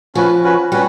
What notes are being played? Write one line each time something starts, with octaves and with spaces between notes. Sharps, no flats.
F3 C#4 F#4 B4
C#4 F#4 B4
G3 C#4 F#4 B4